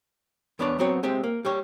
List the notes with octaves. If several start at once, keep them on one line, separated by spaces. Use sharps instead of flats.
E2 B3 D4 C#5 D5
F#3 B3 C4 F#4 C#5
G#3 C4 G4 E5
A#3
G3 G4 C#5